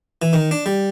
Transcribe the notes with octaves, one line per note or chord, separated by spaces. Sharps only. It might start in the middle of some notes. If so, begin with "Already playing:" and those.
E3
D#3
D4
G3